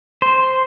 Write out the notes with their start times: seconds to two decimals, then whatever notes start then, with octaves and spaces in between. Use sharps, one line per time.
0.22 C5